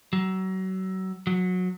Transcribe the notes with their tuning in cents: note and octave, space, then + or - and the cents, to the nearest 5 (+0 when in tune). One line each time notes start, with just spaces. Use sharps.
F#3 +30
F#3 -20